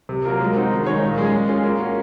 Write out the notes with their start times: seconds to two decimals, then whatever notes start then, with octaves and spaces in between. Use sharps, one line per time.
0.09 C3
0.25 F#3 A#3 F4 A#4
0.40 G#3
0.56 C4 D#4 F#4
0.71 D#3
0.87 G#3 D#4 G#4 C#5
1.02 A#2
1.18 G#3 C#4 G#4
1.33 G#3
1.49 C#4 F4 G#4
1.64 A#3
1.80 C#4 F#4